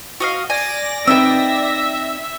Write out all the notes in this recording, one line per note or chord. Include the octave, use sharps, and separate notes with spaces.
F#4 D#5 F5
D5 G#5 A#6
C4 D#4 B4 E5 G5 E6